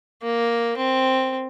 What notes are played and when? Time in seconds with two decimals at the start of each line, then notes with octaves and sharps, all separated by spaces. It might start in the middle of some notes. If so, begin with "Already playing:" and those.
0.23 A#3
0.77 C4